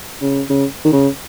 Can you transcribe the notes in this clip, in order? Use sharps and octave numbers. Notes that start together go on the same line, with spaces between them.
C#3
C#3
D#3
C#3